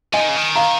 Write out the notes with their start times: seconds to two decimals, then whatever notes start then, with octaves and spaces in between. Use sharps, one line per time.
0.13 F3 D#5 G#5
0.21 D#3
0.29 C#3
0.37 D#3
0.55 F5 A#5